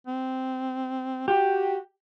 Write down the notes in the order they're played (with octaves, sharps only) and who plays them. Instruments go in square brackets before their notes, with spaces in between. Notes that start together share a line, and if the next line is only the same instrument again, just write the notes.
[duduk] C4
[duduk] F#4 [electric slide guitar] G4